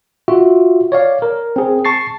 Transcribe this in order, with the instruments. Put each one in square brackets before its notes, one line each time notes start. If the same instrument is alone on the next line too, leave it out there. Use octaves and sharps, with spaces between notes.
[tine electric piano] F4 F#4 E5
C#5 D5 F5
A#4
C4 G#4
A5 C#6 A6 C7